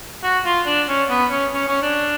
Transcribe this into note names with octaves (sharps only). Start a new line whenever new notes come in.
F#4
F4
D4
C#4
B3
C#4
C#4
C#4
D4